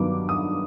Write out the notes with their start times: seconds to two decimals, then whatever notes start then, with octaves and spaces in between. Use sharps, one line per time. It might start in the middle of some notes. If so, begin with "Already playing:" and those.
Already playing: G2 D#3 F#3 B3 D6
0.29 D#6